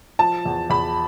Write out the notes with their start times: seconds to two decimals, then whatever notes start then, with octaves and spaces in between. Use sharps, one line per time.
0.19 F3 A5
0.45 E2
0.70 E2 B5